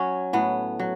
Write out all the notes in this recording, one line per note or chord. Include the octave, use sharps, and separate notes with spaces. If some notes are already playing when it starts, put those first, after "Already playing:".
Already playing: F#3 C#4
A2 B3
F#3